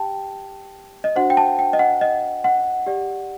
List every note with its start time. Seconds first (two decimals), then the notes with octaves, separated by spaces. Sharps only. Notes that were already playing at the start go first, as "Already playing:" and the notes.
Already playing: G4 G5 A5
1.04 D#5
1.16 D4 F#4 C5 F#5
1.30 G5
1.37 A5
1.59 G5
1.73 D#5
1.79 F#5
2.01 D#5
2.44 F#5
2.86 G4 D5